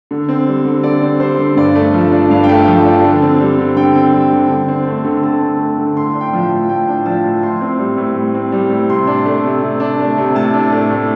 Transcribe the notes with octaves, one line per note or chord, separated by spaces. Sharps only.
D3
C4
G3
D3
D3 D5
C4
G3 C5
D3
G2 D5
A3
F3
D4
G2 F5
G5
A3
F5
F3
D4
D3
C4
G3
D3
D3 G5
C4
G3
D3
D3
C4
A3
D3
D3 A5
C4
A3
D3
A2 C6
D4
G5
F3
A2
A2 G5
D4
F3 A5
A2
A2 C6
C4
G3
A2
A2
C4
G3
A2
C3 C6
D4
A3
C3
C3
D4
A3
C3
A2 A5
D4
A3
A2